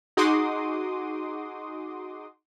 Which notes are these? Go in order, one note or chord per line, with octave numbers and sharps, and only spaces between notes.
D#4 F#4 G#4 C6 D6 D#6